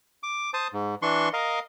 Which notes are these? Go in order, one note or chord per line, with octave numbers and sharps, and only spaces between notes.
D6
C5 A5 D#6
G#2
E3 D4 C6 C#6
A#4 D#5 F5